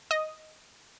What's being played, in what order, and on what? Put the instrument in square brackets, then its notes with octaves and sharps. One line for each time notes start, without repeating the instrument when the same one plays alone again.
[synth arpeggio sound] D#5